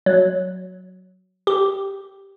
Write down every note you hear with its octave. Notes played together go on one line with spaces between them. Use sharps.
F#3
G4